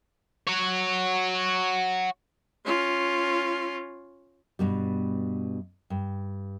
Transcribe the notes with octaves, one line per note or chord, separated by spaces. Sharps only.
F#4 C#5
C#4 F4
G2 B2 G3
G2